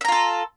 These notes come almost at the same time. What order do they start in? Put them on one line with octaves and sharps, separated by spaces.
E5 A#5 F4 A4